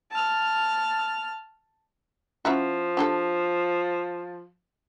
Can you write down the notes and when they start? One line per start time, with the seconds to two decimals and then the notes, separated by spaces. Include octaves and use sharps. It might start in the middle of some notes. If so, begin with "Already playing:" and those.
0.11 A5 F6
2.45 F3 C#4 E4 F#4
2.97 D4 G4 A4